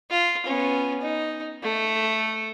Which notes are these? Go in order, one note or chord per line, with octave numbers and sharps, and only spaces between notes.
F4
B3 C#4
D#4
A3